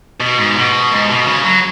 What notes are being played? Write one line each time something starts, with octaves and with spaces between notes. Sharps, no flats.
B2
G#2
B2
G#2
B2
C#3
F#3